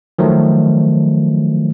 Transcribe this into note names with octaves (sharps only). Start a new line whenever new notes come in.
D#3 F3 F#3 A3